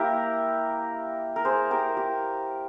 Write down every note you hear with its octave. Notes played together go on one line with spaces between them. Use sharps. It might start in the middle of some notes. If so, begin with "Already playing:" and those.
Already playing: A#3 E4 G4 A#4
A#4
G#4 C5
G4 A#4
G4